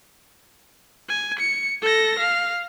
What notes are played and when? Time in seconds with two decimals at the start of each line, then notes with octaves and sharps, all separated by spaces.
1.09 G#5
1.39 C#7
1.82 A4 A#6
2.19 F5